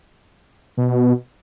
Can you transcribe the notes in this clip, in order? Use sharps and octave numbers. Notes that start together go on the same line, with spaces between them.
B2